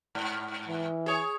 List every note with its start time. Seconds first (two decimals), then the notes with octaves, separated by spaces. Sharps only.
0.15 G#2
0.67 E3
1.06 G#4 C#5